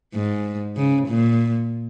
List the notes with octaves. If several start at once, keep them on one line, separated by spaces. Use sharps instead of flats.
G#2
C#3
A#2